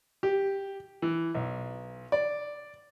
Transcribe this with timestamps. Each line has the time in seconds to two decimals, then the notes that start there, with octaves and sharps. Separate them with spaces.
0.23 G4
1.02 E3
1.35 B1
2.12 D5